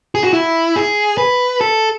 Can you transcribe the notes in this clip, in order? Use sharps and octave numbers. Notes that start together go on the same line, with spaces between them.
G#4
F#4
E4
G#4
B4
A4